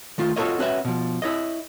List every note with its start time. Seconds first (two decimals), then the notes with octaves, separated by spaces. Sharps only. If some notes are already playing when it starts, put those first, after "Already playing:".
0.18 D#3 A3 F4
0.36 F4 F#4 A4 A#4 C#5 D#5
0.59 C#4 F#4 B4 E5
0.85 B2 F3
1.22 E4 C#5 D#5